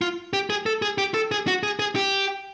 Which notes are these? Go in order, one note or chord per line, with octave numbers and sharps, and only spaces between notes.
F4
G4
G#4
A4
G#4
G4
A4
G#4
F#4
G#4
G#4
G4